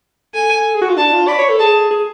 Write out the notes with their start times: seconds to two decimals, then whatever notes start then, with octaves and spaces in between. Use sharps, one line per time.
0.34 A4 G#5
0.74 G#4
0.82 F#4
0.89 F4
0.97 D4 A5
1.13 F4
1.28 D5 B5
1.38 C#5
1.49 A4
1.59 G#4 A5
1.91 G#4